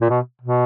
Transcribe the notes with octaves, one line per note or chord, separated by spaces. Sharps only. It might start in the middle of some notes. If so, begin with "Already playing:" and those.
A#2
B2
B2